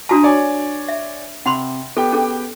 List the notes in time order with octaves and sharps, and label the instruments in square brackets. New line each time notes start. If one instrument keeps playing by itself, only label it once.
[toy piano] D4 F#4 A5 [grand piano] A#5 D#6
[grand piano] C#5 D5 G#5
[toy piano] E5
[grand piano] C3 [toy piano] F#5 B5 C6
[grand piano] B3 G4 G5 [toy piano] A4
[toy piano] C#4 G#4 A4